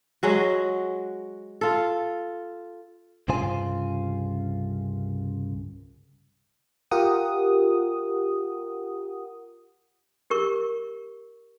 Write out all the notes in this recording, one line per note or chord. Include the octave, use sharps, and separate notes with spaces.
F#3 G#3 F#4
F4 A4
C2 G2 C#3 F4 C5 G#5
F4 G4 A#4 F#5 D#6
G4 A#4 C#6